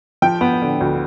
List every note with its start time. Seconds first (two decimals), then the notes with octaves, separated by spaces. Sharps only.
0.22 F3 G5
0.41 B3
0.62 D3
0.81 D2